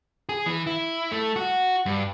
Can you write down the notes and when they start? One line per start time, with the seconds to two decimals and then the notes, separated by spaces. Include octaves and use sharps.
0.29 G#4
0.46 E3
0.67 E4
1.12 A3
1.36 F#4
1.86 G2